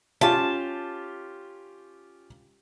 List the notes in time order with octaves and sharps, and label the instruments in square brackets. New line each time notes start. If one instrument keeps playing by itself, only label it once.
[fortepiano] C#4 F4 G4 [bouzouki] A5